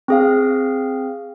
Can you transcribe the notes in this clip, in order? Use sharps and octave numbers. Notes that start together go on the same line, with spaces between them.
C4 G#4 F5